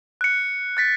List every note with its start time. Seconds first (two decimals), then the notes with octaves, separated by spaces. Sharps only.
0.21 F#6 C#7
0.77 F#6 A6 B6